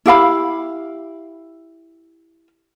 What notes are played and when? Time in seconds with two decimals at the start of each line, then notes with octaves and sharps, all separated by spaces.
0.06 E4 G4 F5 B5